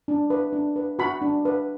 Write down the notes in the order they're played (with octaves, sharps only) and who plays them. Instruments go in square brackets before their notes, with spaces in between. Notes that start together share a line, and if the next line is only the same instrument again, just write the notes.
[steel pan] D4
B4
D4
B4
F#4 B5
D4
B4